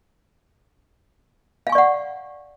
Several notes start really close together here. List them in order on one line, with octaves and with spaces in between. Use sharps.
F5 G#5 C#6 D5 F#5